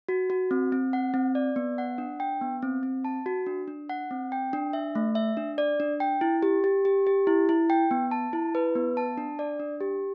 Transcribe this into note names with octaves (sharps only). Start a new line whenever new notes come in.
F#4
F#4
C4
C4
F#5
C4
D5
B3
F#5
D4
G5
B3
C4
C4
A5
F#4
D4
D4
F#5
C4
G5
D4
E5
A3
E5
D4
D5
D4
G5
E4
G4
G4
G4
G4
E4
E4
G5
B3
A5
E4
B4
B3
A5
D4
D5
D4
G4